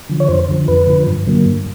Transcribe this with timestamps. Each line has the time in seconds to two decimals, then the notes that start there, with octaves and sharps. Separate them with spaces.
0.09 D3 F3
0.20 C#5
0.28 F2 C5
0.48 D3 F3
0.68 F2 B4
0.87 D3 F3
1.07 G2
1.27 D3 F#3 A#3
1.46 G2